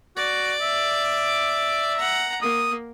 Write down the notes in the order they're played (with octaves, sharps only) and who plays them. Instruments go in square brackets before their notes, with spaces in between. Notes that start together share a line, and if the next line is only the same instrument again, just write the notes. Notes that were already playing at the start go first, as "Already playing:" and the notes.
[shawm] F#4 [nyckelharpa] D5 D6
[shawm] E5
[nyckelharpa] F#5 A#5
[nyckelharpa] A#3 [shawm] D#6